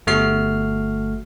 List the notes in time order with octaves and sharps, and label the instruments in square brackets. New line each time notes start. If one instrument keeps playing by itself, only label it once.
[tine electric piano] G1 A3 F#4 F6 C7